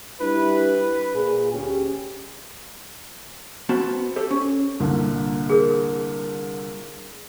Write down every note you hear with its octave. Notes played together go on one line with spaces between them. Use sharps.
G3 D4 E4 B4
A#2 G#4
D2 C#4 G4
B3 C4 F#4 A5
G4 A4 C5
C#4
C2 A#2 D3
G#4 A#4